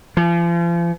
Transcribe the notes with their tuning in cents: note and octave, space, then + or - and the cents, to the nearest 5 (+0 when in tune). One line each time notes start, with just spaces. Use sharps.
F3 -40